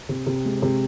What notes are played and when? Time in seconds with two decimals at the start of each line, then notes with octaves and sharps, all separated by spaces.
0.09 C3
0.26 C3
0.45 G#3
0.62 C3